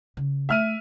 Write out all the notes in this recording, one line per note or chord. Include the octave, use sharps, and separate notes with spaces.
C#3
A3 E5 F6 D#7